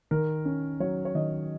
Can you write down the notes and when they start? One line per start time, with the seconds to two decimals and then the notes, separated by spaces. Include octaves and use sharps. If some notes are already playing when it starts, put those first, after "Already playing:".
0.11 D#3 A#4
0.45 C#4
0.80 F#3 C#5
1.05 C#5
1.15 D#3 D#5